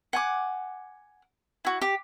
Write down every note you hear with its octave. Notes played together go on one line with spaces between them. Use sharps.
F#5 G#5 D6
E4 F#4
G4